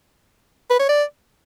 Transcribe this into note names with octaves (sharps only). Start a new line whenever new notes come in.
B4
C#5
D5